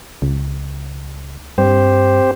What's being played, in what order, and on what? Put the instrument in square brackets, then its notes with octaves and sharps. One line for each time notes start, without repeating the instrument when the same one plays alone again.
[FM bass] C#2
[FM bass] G2 [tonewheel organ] C4 G4 C5